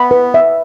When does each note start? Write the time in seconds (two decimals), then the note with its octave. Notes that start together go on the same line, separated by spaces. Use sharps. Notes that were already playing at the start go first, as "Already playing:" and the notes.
Already playing: B3 B5
0.11 B4
0.34 E5